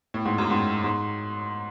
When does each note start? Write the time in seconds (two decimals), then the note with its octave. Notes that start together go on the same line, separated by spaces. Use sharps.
0.14 A2
0.25 G#2
0.38 F#2
0.50 G#2
0.84 G#2